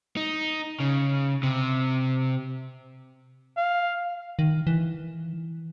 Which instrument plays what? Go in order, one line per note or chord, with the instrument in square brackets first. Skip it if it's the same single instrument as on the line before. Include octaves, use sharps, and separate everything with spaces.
[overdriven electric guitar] D#4
C#3
C3
[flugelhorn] F5
[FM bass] D#3
E3